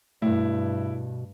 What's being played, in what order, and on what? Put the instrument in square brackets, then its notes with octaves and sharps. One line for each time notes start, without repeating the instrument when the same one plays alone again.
[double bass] G2 [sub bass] B2 [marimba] A3 [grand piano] E4